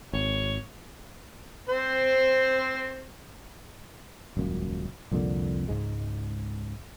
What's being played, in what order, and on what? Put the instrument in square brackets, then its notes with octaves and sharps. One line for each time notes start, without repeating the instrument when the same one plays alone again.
[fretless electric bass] G#1 [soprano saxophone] C#5
[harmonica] C4 C5
[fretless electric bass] D#1 C#2 F#2
C2 F2 A#2 D3
C#2 G#2 G#3